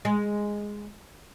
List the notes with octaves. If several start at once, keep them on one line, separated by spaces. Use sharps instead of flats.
G#3